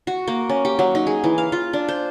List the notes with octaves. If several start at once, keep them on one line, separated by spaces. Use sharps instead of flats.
F#4
A#3
C#4
G4
F#3
D#4
G#4
E3
F5
F4
D4
C5